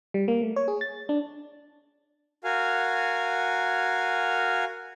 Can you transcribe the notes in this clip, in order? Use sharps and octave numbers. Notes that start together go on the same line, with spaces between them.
G3
A#3
A3
C#5
G#4
A6
D4
F#4 A#4 F5 G#5